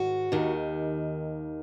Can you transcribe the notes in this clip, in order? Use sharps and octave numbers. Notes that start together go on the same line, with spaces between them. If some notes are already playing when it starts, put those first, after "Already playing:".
Already playing: G#2 D#3 F#4
D#2 D#3